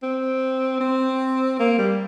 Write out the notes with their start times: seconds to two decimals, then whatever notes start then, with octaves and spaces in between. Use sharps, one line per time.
0.03 C4
0.80 C4
1.60 A#3
1.78 G3